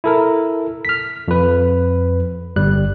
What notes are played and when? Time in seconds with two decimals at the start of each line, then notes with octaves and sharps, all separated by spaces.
0.04 E4 A4 A#4
0.85 F6 B6
1.28 F2 B4
2.56 G1 G3 F#6